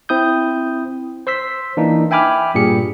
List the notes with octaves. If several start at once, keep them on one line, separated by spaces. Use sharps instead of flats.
C4 E4 D#6 G6
C5 C6 E6 B6
E3 A#3 D4 D#4
E5 G5 G#5 B5 D6 F6
G2 A#2 G4 G#4 C#7